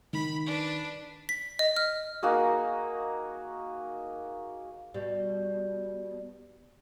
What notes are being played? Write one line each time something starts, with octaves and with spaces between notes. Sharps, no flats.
D#3 B5
D4 B4
B6
D#5
F6
A#3 D#4 F#4 G#4
B2 G3